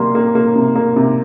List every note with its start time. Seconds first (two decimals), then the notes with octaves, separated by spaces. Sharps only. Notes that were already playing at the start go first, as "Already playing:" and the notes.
Already playing: C3 G3 A#3 C6
0.15 A#3
0.35 A#3
0.56 C3
0.75 A#3
0.96 C3